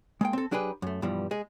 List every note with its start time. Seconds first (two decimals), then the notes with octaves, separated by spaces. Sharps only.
0.21 G#3 A#3 G5
0.33 C4 A4
0.51 F#3 D4 G4 G#4 B4
0.82 F#2 A3
1.02 G2 B2 E3 F3 G3
1.31 G#3 G#4